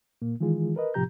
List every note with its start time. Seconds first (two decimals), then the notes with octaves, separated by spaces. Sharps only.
0.22 A#2 A#3
0.40 D#3 E3 G#3 F4 G#4
0.76 A#4 B4 D#5
0.94 A2 C3 F3 G4 A#5 G6